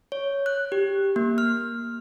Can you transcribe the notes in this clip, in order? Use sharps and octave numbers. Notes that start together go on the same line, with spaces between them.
C#5
F#6
G4
A#3
F6